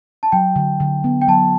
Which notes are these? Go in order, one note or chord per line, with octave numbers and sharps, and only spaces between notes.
A5
F#3 G5
D3
D3
B3
G5
F#3 A5